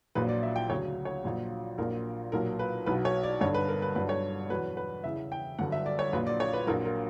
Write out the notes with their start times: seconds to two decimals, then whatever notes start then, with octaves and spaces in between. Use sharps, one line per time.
0.15 A#1 A#2 F#3 B4
0.29 D5
0.43 E5
0.56 G5
0.69 D2 C#3 F#3 C#5
1.05 C#5
1.24 A#1 A#2 F#3
1.78 A#1 A#2 F#3 A#4
2.32 B1 A#2 F#3 A#4
2.59 B4
2.86 B1 B2 F#3 B4
3.05 C#5
3.23 D5
3.41 G1 G2 D3 C#5
3.54 B4
3.68 A#4
3.82 B4
3.95 G1 G2 D3 F#3 B4
4.09 C#5
4.49 E2 B2 F#3 B4
4.77 B4
5.04 E2 C#3 E3 E5
5.32 G5
5.59 G1 G2 D3 F#3 F#5
5.72 E5
5.86 D5
5.99 C#5
6.13 A#1 A#2 F#3 B4
6.27 D5
6.40 C#5
6.53 B4
6.67 A#1 A#2 F#3 A#4
6.85 A#4